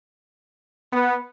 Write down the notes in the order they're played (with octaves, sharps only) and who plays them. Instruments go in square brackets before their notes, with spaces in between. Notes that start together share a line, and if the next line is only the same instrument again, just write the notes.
[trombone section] B3